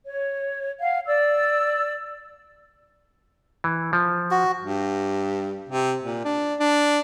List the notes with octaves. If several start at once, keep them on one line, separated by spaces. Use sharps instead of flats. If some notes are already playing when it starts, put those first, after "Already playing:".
C#5
F5 F#5
D5 E6
E3
F3
F#4
G2
C3
A#2
D4
D4